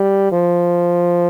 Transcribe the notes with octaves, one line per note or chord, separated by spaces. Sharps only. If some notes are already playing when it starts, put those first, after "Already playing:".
Already playing: G3
F3